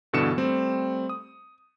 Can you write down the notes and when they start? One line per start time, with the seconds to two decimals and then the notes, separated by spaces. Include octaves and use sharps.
0.13 G2 B2 D3 E3 C#7 E7
0.37 G3 A3 C4
1.09 D#6